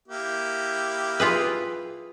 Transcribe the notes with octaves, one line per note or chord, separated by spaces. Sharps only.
A#3 E4 G4
F4 G#4 B4